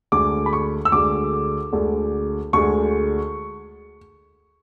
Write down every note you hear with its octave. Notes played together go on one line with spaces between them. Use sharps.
D2 D3 G#3 D6
B5
C#6
E6
D2 D3 G#3 D6
D2 D3 G#3
D2 D3 G#3 C#6